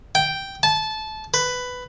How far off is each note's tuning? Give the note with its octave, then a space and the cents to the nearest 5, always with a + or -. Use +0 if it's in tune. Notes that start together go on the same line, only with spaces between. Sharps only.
G5 -5
A5 -20
B4 +10